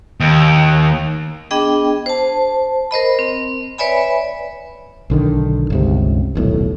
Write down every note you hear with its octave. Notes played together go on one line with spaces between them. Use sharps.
D#2
B3 D4 G#4 D#5 G5
C5 A5
A#4 C5 D#5 B5
C4
B4 C#5 D5 E5 G#5 B5
B1 D3 D#3
G1 C#2 C3
D#1 B1 A2